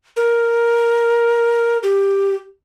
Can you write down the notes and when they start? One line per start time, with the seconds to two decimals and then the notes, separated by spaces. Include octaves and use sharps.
0.17 A#4
1.83 G4